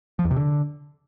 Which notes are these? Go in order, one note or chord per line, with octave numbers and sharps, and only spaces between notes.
F3
E2
C3
D3